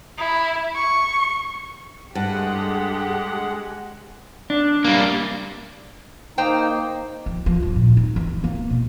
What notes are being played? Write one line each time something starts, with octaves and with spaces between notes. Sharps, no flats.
E4
C#6
G2 G#3 G4 A4 F#5
D4
G3 A#3
A#3 D#4 C5 G5 A#5
F3
F3
G2
A#2
D#4
E3
A#3
B2